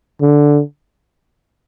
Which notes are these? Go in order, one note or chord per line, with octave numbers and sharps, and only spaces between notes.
D3